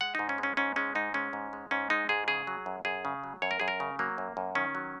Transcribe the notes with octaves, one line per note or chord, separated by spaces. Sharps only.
G#3 F#5
G#2 D#4
C#4
G#3
C#4
G#2 C#4
G#3 C#4
G#2 D#4
G#3 C#4
G#2
G#3
G#2 C#4
G#3 D#4
G#2 G#4
C#3 G#4
F#3
F#2
F#2 G#4
C#3
F#3
F#2 C#5
A#4
F#2 G#4
A#4
C#3
F#3 A#3
F#2
F#2
D#3 C#4
F#3